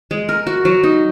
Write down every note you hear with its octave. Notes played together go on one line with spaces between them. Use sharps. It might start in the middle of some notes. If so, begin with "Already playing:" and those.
G#3
A#4
F#4
F#3
D#4